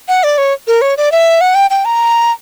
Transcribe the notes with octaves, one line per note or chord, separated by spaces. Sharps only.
F#5
D5
C#5
A#4
C#5
D5
E5
F#5
G5
G5
A#5